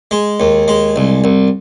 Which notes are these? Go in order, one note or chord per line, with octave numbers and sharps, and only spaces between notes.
G#3
D#2
G#3
C2
C2